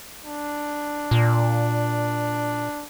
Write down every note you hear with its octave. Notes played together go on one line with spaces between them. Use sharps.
D4
A#2